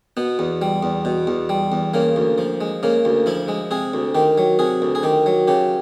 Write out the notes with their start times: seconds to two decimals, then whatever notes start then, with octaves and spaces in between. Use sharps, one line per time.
0.17 B2 B3
0.39 E2
0.62 G3
0.83 E2
1.05 B2
1.27 E2
1.49 G3
1.72 E2
1.94 C#3 A#3
2.16 D2
2.38 F3
2.61 G#3
2.83 C#3 A#3
3.05 D2
3.26 F3 E4
3.48 G#3
3.71 C3 G#4
3.94 D2
4.15 D#3 G4
4.38 F#3
4.59 C3 G#4
4.82 D2
4.95 G#4
5.03 D#3 G4
5.26 F#3
5.48 C#3 G4